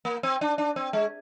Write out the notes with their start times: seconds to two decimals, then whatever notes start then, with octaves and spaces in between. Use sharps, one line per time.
0.05 A#3
0.23 C4
0.41 D4
0.58 D4
0.76 C4
0.93 G#3